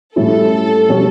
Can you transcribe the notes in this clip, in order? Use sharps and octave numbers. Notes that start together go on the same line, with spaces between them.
A2 G3 C#4 E4 A4
B2 G3 C#4